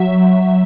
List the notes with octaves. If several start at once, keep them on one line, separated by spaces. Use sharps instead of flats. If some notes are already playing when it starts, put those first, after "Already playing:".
Already playing: F#3 E5